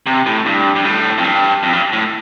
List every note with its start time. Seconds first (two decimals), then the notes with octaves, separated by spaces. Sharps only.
0.07 C3
0.26 A2
0.46 G2
0.75 G2
0.85 A2
1.18 F2
1.24 G2
1.63 F2
1.73 G2
1.93 A2